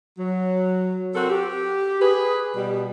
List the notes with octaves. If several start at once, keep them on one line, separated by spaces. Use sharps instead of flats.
F#3
C4 F#4 A4 A#4 C5
G4
G#4 B4
B2 G3